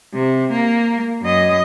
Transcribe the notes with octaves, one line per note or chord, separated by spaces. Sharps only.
C3
A#3
F#2 D#5